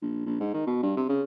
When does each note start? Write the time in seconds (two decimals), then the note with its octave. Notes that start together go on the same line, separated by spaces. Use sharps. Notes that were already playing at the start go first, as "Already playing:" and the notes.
0.02 A#1
0.26 A#1
0.40 G#2
0.54 D#3
0.67 B2
0.82 G2
0.97 C3
1.09 C#3